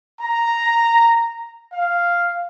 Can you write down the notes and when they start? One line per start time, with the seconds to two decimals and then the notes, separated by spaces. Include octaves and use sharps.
0.21 A#5
1.73 F5